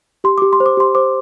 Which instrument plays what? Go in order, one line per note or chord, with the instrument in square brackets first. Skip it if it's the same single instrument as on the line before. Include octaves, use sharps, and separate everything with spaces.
[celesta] G4 C6
G4 D6
C6
C5
D6
G4 C6
C5 D6